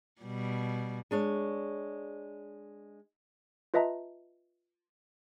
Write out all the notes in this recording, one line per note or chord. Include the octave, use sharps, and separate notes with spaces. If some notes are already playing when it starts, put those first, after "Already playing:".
B2 G3
G#3 D4 C#5
F4 B4 D#5 E5 A5 A#5